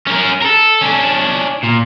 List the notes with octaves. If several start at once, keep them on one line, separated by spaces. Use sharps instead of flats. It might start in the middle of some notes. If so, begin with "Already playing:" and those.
C#4 A#4
A4 A#4
C#4 D4
A#2